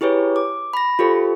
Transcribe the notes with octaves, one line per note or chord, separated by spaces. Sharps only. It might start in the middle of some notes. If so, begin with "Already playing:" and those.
E4 G4 G#4 B4 C#5
D6
B5 A#6
F4 G4 A4 C5